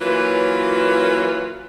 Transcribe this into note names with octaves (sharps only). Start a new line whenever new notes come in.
E3 F#3 A#3 C#4 F4 B4